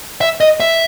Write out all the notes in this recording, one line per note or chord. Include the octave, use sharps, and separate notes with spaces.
E5
D#5
E5